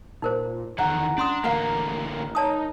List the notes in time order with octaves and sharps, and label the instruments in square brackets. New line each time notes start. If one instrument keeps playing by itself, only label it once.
[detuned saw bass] A#2 [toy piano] D#4 A#4 C5
[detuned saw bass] E2 [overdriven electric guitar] D3 D#3 [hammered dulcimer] F#5 A#5
[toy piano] C#4 C6 D#6 [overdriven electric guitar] D4
[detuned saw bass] A1 [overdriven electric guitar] D3 A#3 [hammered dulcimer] A#4 [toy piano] F5 F#5 A#5
[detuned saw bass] D#4 [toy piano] C#5 A5 D#6